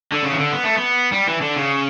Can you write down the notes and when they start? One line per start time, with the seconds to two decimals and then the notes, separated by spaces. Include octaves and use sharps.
0.12 D3
0.23 C#3
0.33 E3
0.39 D3
0.52 B3
0.64 A3
0.75 B3
1.12 G3
1.28 E3
1.41 D3
1.57 C#3